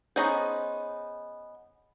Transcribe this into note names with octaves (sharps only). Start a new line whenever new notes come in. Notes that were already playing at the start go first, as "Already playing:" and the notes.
B3 C#4 D#4 G#4 C5